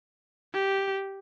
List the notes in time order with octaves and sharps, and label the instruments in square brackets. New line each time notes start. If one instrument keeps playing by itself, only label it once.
[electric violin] G4